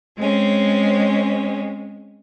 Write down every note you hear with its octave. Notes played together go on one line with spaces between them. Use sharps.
G#3 C4 C#4